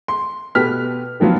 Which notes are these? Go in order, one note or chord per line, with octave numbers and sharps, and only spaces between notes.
C6
B2 G4 A4 B4 F6 B6
D#3 F3 F#3 B3 F4